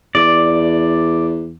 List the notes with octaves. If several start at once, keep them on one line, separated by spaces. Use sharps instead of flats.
E2 D5